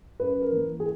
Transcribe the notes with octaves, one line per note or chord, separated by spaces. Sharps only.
F#2 B4
A#4
E3 A#3
G#4